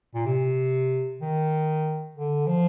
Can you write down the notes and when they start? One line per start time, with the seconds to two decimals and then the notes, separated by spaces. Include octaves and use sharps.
0.14 A#2
0.26 C3
1.21 D#3
2.15 D3
2.47 F3